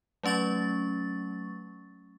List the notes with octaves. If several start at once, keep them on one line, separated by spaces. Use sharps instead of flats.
F#3 A3 C#4 C#6 A6